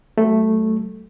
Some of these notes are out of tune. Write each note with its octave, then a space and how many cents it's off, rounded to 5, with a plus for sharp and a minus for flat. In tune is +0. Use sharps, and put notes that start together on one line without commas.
F#3 +40 A3 +0